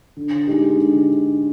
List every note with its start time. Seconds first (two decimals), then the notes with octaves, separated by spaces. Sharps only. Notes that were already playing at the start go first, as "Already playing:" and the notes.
0.17 D3
0.47 G#3 D#4 G4
0.76 D3